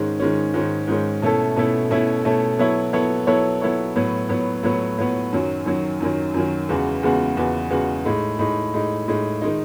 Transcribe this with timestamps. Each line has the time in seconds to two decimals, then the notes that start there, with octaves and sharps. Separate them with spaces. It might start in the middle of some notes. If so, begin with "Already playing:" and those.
Already playing: G#2 D#3 G#3 C#4
0.20 G#2 D#3 G#3 C#4
0.54 G#2 D#3 G#3 C#4
0.88 G#2 D#3 G#3 C#4
1.22 B2 A3 C#4 E4 A4
1.56 B2 A3 C#4 E4 A4
1.91 B2 A3 C#4 E4 A4
2.25 B2 A3 C#4 E4 A4
2.59 F#3 B3 E4 A4 C#5
2.93 F#3 B3 E4 A4 C#5
3.27 F#3 B3 E4 A4 C#5
3.61 F#3 B3 E4 A4 C#5
3.96 A2 F#3 B3
4.29 A2 F#3 B3
4.63 A2 F#3 B3
4.98 A2 F#3 B3
5.33 F#2 D#3 F#3
5.66 F#2 D#3 F#3
6.00 F#2 D#3 F#3
6.34 F#2 D#3 F#3
6.69 E2 C#3 G#3 B3 F#4
7.03 E2 C#3 G#3 B3 F#4
7.37 E2 C#3 G#3 B3 F#4
7.71 E2 C#3 G#3 B3 F#4
8.05 A2 G#3 D#4
8.39 A2 G#3 D#4
8.74 A2 G#3 D#4
9.08 A2 G#3 D#4
9.42 D#3 G#3 D#4